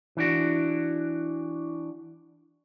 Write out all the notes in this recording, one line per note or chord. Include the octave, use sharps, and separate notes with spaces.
E3 D4 F#4